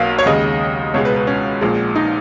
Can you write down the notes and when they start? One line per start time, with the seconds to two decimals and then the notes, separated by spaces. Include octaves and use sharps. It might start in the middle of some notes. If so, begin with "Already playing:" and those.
Already playing: B1 B2 A#3 F5
0.19 C#5
0.26 D#2 C#3 G#3 D#5
0.94 C#2 B2 G#3 C#5
1.05 B4
1.16 B4
1.27 C#4
1.61 A#1 A#2 G#3
1.96 D#4